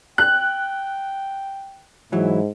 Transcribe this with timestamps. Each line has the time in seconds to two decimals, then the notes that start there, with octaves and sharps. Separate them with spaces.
0.18 G5 F#6
2.12 G#2 E3 F#3 E4